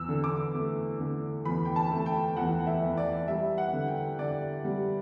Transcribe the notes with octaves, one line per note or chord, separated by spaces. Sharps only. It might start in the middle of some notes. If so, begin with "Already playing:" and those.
Already playing: E2 E6
D3
D6
A3
D3
E2 B5
G5
A5
A3
G5
E2 F#5
E5
E2
D5
G3 E5
F#5
D3
G5
D3 D5
G3